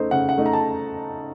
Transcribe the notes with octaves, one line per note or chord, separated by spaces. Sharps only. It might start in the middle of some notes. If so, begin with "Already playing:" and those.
Already playing: C#3 A3 D#4 A4 C5
C#3 F#5
F#5
A3 D#4
A#5
A5